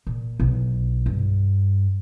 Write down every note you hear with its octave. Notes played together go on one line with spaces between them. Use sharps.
A#2
B1
G2